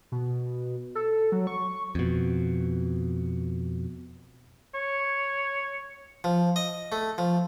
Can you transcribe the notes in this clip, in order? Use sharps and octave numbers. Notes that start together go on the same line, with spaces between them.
B2
A4
F#3
C#6
F2 B2
C#5
F3
D#5
A3
F3